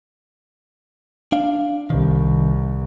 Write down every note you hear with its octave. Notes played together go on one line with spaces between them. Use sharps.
D4 F5
C2 D#3